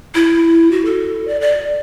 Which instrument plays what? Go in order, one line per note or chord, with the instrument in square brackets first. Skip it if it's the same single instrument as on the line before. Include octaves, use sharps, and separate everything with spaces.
[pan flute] E4
F#4
A4
D5
D5